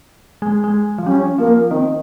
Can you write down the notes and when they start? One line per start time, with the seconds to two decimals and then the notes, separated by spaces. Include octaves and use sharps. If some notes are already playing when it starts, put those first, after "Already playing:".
0.42 G#3
0.64 G#3
0.98 F3
1.06 G3 C#4
1.38 F3 A#3
1.70 D#3 C4